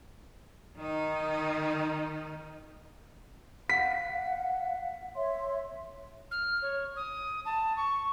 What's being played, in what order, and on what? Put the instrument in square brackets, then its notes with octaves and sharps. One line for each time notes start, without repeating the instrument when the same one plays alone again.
[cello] D#3 D#4
[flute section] F5 F#5 [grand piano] B6
[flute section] C#5 E5 C6
[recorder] F6
C#5
D#6
A5
C#6